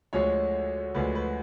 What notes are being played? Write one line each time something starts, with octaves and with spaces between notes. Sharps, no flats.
D2 D3 F3 G#3 C#5
D2 D3 F3 G#3 B4
B4